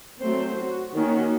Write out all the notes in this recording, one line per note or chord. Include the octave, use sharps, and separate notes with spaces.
F#3 A3 C4 C5
F#4
D#3 A#3 C#4 F#4